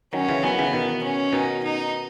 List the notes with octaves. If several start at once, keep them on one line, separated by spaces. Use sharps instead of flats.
D#3 F#3 C#4
C#3 E3
D#3 F#3 B3
C#3 E3
B2 D#3
C#4
B2 D#3 D#4
D#4